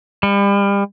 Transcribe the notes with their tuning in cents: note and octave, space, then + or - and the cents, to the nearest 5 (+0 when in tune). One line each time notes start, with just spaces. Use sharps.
G3 +35